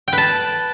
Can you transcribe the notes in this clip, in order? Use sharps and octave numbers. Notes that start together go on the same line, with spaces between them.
G5
B4
A5